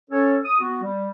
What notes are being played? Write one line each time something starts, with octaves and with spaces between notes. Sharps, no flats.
C#4 A4 C#5
D#6
B3 F#4
G3